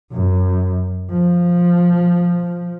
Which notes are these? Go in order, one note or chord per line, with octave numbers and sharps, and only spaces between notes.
F#2
F3